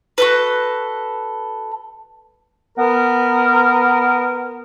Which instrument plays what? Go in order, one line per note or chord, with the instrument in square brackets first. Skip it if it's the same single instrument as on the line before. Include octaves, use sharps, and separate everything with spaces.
[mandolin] F#4 A4 B4
[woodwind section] B3 A#4